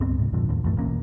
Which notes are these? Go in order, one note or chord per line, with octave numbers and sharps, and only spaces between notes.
C#2 G2 B3 C4
G#2 C3
F2 A#2 D3 F3
D#2 A2
B1 F#2 E3 A3
E1 E2 A#3 C#4